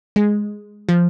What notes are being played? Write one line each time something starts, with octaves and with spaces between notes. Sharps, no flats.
G#3
F3